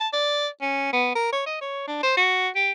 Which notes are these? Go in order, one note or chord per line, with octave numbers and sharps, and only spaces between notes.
A5
D5
C#4
B3
A#4
C#5
D#5
C#5
D4
C5
F#4
G4